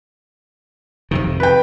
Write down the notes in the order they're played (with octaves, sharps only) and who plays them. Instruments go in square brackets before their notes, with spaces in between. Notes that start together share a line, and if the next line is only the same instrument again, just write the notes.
[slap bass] F2 C3 D#3
[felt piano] B4 G5